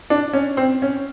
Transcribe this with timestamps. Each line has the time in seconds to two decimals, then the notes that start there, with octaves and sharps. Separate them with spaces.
0.10 D4
0.33 C#4
0.57 C4
0.82 C#4